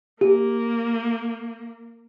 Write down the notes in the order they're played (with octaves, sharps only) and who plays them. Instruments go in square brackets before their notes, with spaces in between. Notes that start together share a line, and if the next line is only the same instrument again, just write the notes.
[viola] A#3 [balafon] G4